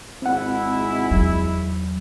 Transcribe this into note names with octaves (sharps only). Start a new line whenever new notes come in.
G#1 G#3 C4 E4 F#5
E2 F#3